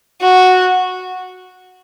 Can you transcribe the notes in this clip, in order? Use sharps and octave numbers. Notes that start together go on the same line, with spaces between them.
F#4